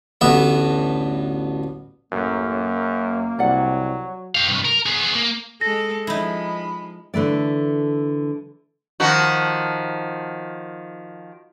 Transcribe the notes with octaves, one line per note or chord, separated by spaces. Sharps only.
A1 D2 B3 E5
A1 F#2 A#3
F#1
C2 F#3 D5 F#5
G4 F5
C2 G2
A#4
B3 G#4
A#3
G#3 A4 A#6
F3 G#3 D#4 E4 B5
D3 E3 A3 D5
D#3 F3 F#4